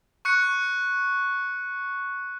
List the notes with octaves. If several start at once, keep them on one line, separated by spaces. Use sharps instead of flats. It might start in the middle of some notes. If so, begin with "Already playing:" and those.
C#6 F#6 C#7